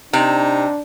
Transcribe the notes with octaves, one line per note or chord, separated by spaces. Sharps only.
C3 D4 D#4